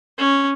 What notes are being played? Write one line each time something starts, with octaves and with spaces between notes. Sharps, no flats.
C#4